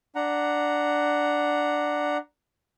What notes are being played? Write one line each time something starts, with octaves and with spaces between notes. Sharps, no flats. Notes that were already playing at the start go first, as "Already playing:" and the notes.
D4 F#5 A#5